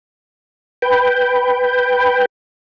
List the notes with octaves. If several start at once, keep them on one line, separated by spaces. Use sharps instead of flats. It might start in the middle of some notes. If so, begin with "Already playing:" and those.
B4 G5